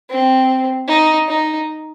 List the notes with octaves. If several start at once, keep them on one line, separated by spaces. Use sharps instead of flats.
C4
D#4
D#4